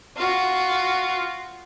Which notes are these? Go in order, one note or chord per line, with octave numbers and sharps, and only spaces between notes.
F4 F#4